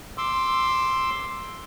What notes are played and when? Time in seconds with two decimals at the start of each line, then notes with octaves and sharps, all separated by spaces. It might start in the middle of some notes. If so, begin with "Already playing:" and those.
0.18 C6 D6 E6